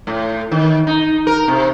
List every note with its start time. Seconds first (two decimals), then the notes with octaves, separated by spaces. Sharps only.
0.07 A2
0.51 D#3
0.87 D#4
1.27 A#4
1.48 C3